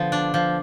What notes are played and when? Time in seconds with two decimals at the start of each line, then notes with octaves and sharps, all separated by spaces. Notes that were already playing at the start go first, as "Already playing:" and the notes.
Already playing: D3 F3 B3
0.12 D4
0.34 F3